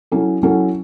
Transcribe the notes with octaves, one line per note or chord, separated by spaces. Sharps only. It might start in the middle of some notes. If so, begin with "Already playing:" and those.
F#3 C#4 E4 A4
F#3 C#4 E4 A4